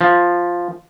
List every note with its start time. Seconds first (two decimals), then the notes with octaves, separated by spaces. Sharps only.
0.01 F3